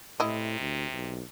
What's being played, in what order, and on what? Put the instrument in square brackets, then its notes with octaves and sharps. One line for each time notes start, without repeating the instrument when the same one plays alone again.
[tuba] A2 [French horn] C3 [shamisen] E4 D#5
[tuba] D2
B1